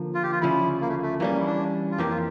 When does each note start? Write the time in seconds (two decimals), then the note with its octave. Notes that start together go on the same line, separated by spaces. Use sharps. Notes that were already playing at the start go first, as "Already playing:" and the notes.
Already playing: D3 F3 A#3
0.15 F4
0.23 G4
0.32 F4
0.41 D2 C#3 F3 C#4 E4
0.81 A#3
0.88 A3
1.02 A3
1.20 E3 G3 A#3 C#4
1.40 E4
1.46 D4
1.92 F4
1.98 F2 E3 A#3 G4
2.11 F4